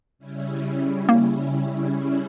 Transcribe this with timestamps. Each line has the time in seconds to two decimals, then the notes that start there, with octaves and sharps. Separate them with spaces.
0.19 C#3 G3 C#4 E4
1.09 A#3